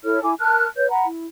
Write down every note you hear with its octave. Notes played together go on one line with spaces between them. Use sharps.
E4 A4 C#5 F6
E4 G#5 D6
A#4 A5 F6 F#6
B4 C#5 G6
F#5 A#5 B5
E4